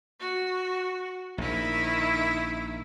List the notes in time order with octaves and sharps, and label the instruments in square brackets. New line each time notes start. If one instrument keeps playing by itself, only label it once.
[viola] F#4
[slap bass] A#1 [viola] D#3 E4